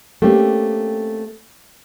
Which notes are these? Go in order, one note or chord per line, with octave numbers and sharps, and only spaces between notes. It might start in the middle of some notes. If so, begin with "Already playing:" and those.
A3 A#3 C4 C#4 G4